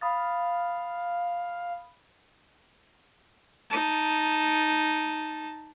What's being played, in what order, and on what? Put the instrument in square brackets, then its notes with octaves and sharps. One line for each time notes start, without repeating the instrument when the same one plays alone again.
[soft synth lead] F5 [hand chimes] B5 D#6 A6
[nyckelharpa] D#4 A5